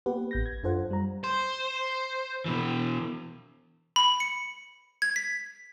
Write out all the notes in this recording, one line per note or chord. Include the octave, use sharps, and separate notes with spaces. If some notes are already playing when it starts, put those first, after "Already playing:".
A#3 B3 G4 B4 F#5
A1 G6 A#6
G#6
F#2 D4 F4 A4 C5 F#5
G3 A#5
C5
B2 E3
B5
C#7
G#6
B6